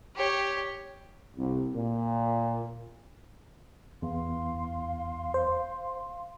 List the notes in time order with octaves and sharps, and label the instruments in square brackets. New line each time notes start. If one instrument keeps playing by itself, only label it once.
[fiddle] G4 C#5
[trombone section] C2
A#2
[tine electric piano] E2 [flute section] F5 C6
[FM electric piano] C5